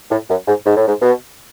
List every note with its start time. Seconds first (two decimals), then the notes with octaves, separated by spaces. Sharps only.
0.11 A2
0.30 F#2
0.48 G#2
0.66 G#2
0.77 A2
0.88 G#2
1.02 B2